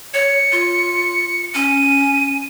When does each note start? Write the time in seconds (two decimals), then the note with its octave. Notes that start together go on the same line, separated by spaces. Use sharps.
0.14 C#5 C#7
0.52 F4
1.54 C#4 D#7